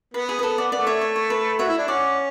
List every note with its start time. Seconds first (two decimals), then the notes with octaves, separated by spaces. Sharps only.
0.14 B3 B4
0.29 G#4
0.39 B4
0.43 A4
0.58 D5 F#5
0.72 A3 D5 F#5
0.87 C#5 E5
1.01 C#5
1.16 C#5
1.30 B4
1.59 F#4 C#5 E5
1.68 E4
1.78 D4
1.88 C#4 D5 F#5